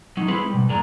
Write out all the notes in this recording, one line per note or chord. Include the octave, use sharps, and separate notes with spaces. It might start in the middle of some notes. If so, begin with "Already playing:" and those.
F#3 D#4
G#3 C4 E4 G#4 A4 B4
B2 G3
F2 A2 D4 G#4 A#4 A#5